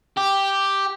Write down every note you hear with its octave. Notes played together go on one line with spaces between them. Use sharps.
G4